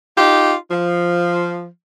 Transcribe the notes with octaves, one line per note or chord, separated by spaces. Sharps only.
D#4 F4 G4
F3